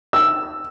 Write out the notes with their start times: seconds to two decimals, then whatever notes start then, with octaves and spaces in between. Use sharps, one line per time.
0.13 E6